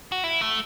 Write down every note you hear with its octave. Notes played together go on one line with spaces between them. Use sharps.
F#4
E4
A3